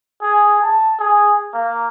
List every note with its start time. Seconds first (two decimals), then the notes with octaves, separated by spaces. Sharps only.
0.22 G#4
0.62 A5
0.99 G#4
1.53 A#3